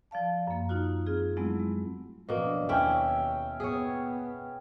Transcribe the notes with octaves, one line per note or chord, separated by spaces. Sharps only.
F3 D5 F5 A5
F#2 A#3
D#4 F4 F#4
C4 F4 G#4
F#3 G#3 A3 B3 C4 E4
G#3
B2 F3 A#3 D4
D#2 C#4 E4 E5 G5
B3 G#4 C#5